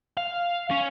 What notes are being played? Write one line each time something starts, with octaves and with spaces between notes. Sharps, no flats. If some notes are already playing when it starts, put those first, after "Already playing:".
F5
C#4